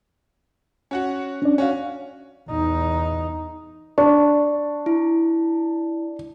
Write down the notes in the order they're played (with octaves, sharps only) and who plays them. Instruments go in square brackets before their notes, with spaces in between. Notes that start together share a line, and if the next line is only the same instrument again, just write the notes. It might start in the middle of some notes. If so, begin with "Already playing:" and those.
[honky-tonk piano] C#4 F#4 F#5
[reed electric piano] C#4 D4 D5
[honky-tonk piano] C#4 F#4 [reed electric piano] C#5 F5
[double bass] E2 D#4
[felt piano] D4 [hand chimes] C#6
[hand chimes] E4